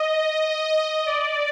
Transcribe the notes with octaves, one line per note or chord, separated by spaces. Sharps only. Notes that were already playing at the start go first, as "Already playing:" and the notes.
Already playing: D#5
D5